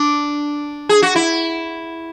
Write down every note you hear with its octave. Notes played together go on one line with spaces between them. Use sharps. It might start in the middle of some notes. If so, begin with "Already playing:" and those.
Already playing: D4
G#4
F#4
E4